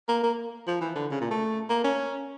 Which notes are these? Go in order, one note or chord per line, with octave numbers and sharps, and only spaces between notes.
A#3
A#3
F3
E3
D3
C#3
A#2
A3
A#3
C#4